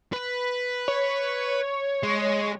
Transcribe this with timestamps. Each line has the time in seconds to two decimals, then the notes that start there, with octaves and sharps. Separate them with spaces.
0.13 B4
0.88 C#5
2.03 G#3